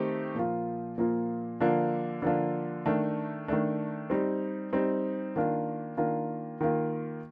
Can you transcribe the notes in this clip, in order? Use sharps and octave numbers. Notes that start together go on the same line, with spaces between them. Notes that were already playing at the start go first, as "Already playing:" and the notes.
Already playing: D#3 A3 C4 D#4 G4
A#2 F3 A#3 F4
A#2 F3 A#3 F4
D3 F3 A#3 D4 F4
D3 F3 A#3 D4 F4
D#3 A3 D4
D#3 A3 D4
G3 C4 D#4
G3 C4 D#4
D#3 A#3 D4 F4
D#3 A#3 D4 F4
D#3 A#3 F4